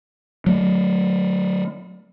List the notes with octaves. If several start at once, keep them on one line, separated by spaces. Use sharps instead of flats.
F#3 A3